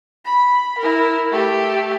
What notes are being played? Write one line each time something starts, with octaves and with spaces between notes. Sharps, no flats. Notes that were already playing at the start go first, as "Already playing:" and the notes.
B5
E4 A#4
A3 G4